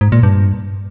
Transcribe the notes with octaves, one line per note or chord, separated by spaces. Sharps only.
G#2
A#2
G2